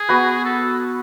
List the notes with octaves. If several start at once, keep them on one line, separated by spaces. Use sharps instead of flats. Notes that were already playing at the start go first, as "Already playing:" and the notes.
Already playing: G#4
B3 F#4 B4
A4